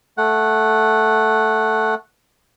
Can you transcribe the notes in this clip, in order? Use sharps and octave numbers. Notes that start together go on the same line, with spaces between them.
A3 F#5